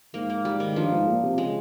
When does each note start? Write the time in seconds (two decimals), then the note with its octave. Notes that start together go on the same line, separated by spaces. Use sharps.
0.14 G#2 A#3
0.30 A#3
0.45 G3
0.60 D#3
0.76 G2 F3
0.91 G#2
1.07 A#2
1.23 C3
1.38 C#3 G#3